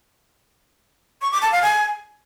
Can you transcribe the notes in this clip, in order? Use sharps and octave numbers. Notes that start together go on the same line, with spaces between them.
C#6
D6
A5
F5
G#5